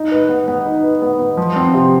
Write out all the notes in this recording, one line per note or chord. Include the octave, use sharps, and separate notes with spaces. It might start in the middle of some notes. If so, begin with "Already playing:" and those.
Already playing: D#4
B4
B3
B3
D#4
B4
B3
B3
F3
C4
C3